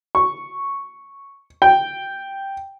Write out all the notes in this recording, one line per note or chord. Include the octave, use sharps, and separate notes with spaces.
C#6
G5